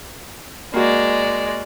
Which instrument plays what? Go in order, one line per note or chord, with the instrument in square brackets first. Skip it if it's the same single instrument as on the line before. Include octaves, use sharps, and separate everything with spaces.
[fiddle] G#3 D5 [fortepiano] A#3 F#4